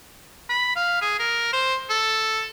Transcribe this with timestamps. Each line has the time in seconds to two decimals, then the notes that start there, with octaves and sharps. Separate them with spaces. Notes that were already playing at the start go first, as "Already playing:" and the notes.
0.49 B5
0.76 F5
1.01 G#4
1.19 A#4
1.53 C5
1.90 A4